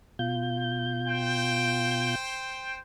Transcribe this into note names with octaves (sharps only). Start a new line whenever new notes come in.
B2 F4 G6
C5 G5